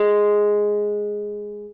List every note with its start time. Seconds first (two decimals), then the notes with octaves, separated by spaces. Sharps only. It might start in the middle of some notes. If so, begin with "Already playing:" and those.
Already playing: G#3